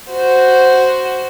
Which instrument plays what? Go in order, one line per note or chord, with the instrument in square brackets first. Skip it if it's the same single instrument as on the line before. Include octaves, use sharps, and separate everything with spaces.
[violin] F#4 C5